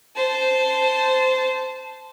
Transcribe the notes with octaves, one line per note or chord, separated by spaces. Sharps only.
C5 A5